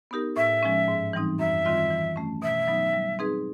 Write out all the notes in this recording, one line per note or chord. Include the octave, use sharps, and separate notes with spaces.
B3 D#4 G4 A#4
A2 E5
F3 G#3 C#4
G#2
E3 G3 C4 D#4
F#2 E5
D#3 G3 C4 F4
E3
A3 C#4
B2 E5
F#3 B3 D#4
G3
C4 D#4 G#4 B4